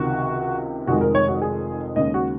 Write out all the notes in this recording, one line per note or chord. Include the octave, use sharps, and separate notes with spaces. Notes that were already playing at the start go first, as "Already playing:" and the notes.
Already playing: C#2 C3 D#3 F#4
F1 F2 D#3 G#3 F#4
A#4
C#5
F#4
G#4
D#2 C#3 G#3 D#5
F#4